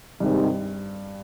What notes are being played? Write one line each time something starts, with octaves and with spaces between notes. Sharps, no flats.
G2 C3 D#3 G#3 C4 D#4